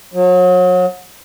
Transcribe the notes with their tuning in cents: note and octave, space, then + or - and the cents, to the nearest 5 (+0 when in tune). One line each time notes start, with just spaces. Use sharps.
F#3 -35